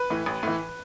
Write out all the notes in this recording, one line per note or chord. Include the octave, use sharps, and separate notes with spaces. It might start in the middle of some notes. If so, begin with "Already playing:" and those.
Already playing: B4
A2 E3
A1
A2 E3